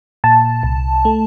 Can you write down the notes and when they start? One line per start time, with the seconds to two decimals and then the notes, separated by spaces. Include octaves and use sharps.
0.24 A#2 A5
0.63 C2
1.05 A3